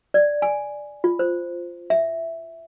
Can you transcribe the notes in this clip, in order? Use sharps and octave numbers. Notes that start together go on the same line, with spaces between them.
D5
G#5
F4
C5
E5